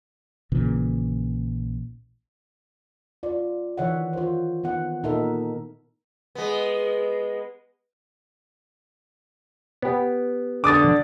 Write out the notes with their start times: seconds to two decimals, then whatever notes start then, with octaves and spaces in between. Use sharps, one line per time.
0.52 A#1 A#2 C#3 E3
3.23 F4 D5
3.78 D#3 E3 C#5 E5 F#5
4.13 F4 C5
4.63 D#3 B3 F#5
5.03 A#2 D#4 A4 A#4 E5
6.35 G#3 B3
9.82 B3 G4
10.64 D3 D6 D#6 A6